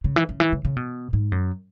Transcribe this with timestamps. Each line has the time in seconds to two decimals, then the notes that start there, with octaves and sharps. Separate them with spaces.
0.04 C#3
0.16 E3
0.29 C#3
0.40 E3
0.53 C#3
0.65 C#3
0.76 B2
1.13 G#2
1.32 F#2